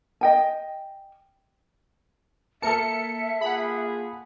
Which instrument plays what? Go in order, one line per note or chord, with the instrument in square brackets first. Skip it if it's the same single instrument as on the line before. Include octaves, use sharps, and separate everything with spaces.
[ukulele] D#5 G5 G#5
[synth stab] A#3 A#4 C#7 [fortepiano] A4 A5 [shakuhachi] E5
[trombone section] A#3 F4 G#4 [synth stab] F#5 B5